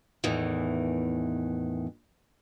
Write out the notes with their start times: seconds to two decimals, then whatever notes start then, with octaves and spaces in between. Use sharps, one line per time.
0.24 E2 A2 D#3 E3